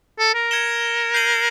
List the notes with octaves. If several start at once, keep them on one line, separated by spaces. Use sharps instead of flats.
A4
A#4
G#6 C#7 E7 G7
G6 C7 D#7 F#7